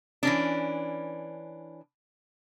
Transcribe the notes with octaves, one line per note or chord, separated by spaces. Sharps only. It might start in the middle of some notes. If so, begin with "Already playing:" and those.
E3 C#4 D4